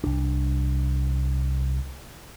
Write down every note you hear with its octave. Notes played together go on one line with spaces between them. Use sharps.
C2 D4